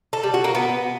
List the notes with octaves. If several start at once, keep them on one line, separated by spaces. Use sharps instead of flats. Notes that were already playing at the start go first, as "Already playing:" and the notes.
A4
G3
F#4
A#3
B3